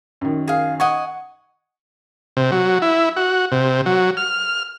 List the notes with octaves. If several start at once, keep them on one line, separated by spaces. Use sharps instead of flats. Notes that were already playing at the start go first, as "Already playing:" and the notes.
F#2 D#3
G#4 F5
D#5 F#5 G#5 C#6
C3
F#3
E4
F#4
C3
F#3
F6